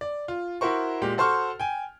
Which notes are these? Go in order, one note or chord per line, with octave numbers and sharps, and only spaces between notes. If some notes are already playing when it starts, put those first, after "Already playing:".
D5
F4
E4 F#4 A#4 C5 C#6
A#2 G#3 G4
F#4 A4 C5 C6 C#6 F6
G5 G#5